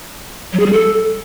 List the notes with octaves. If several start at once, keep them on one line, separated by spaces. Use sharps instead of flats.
F#3
G#4
G3
A4